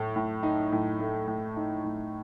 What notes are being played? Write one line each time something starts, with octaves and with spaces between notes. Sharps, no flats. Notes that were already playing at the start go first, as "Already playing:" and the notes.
Already playing: A2 A3
A2
D#4
A2
A3
A2
D#4
A2